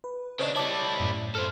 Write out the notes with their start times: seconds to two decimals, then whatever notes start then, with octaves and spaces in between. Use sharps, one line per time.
0.04 B4
0.39 C#3 D4 C5 C#5 D#5
0.56 G3 E4 C#5 A5 D6
1.00 F#2 A2
1.35 A4 C5 F6